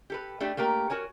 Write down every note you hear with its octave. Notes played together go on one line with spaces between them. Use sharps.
G4 A4 B4
A3 D4 G4
A3 A#3 G4 A#4
F#4 A#4 C#5 G#5